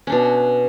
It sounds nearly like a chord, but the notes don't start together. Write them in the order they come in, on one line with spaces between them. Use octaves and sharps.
C#4 D4 B2